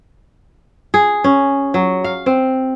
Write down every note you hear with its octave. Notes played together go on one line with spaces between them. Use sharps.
G#4
C#4
F#3
F5
C4